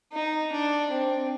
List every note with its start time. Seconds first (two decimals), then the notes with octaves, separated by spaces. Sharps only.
0.12 D#4
0.52 D4
0.91 C4